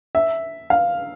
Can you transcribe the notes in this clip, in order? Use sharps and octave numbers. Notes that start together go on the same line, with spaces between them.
E5
F5